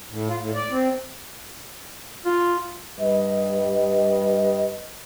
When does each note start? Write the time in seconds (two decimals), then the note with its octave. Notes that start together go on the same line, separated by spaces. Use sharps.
0.11 A2
0.29 F4
0.40 A2
0.54 D5
0.71 C4
2.25 F4
3.00 G2 G3 B4 D#5